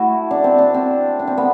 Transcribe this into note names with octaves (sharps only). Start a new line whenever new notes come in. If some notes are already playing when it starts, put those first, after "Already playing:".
Already playing: A3 E4 F#4
D4
C4
D4
C4
D4
C4
B3